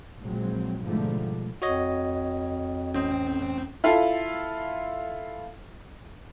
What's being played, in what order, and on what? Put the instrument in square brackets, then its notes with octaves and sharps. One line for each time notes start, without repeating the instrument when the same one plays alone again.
[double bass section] A#1 F#3 G#3 C4
G#2 B2 D3 F3 G3 A3
[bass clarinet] F2 [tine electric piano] F#4 C#5 D#5
[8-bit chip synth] A1 C4 [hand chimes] C#4
[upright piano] E4 F4 A4 F5